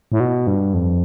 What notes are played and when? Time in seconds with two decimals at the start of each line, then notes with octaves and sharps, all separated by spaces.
0.12 A2
0.20 B2
0.47 G2
0.74 F2